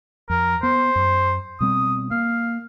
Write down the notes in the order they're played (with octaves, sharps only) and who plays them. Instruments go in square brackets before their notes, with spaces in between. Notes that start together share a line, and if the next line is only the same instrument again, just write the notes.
[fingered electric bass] F2 [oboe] A#4
[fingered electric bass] B3 [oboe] C5
[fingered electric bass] F#2
[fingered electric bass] B2 G3 C4 [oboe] D#6
[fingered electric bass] A#3 [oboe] F5